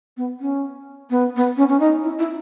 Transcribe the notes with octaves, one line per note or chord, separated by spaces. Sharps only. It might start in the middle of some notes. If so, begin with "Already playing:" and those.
B3
C#4
B3
B3
C#4
C#4
D#4
E4
E4